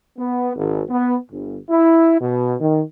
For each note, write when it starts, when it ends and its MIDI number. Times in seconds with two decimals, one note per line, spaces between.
0.18 0.51 59
0.56 0.81 32
0.90 1.15 59
1.31 1.59 31
1.70 2.16 64
2.20 2.54 47
2.60 2.82 51